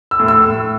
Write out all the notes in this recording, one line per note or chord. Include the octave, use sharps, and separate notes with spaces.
E6
A2
E6
A2